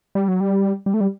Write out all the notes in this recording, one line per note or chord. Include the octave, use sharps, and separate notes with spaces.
G3
F#3
G3
G3
A3
G3